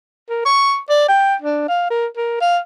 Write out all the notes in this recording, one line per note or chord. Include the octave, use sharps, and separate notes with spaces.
A#4
C#6
D5
G5
D4
F5
A#4
A#4
F5